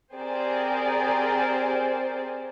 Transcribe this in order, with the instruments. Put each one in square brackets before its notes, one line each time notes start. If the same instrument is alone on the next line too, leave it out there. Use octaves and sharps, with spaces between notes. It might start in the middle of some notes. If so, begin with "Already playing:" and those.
[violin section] C4 G4 G#4 A#4 C5 D5